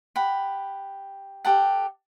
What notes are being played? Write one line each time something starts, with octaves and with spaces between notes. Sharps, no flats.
G4 F#5 B5
G4 A4 F#5